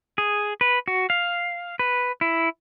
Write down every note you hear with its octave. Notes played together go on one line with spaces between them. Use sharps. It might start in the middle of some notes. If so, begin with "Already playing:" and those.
G#4
B4
F#4
F5
B4
E4